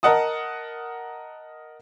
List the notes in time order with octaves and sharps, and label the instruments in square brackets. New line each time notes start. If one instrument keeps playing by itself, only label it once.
[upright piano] A#4 D#5 F#5 A5 D#6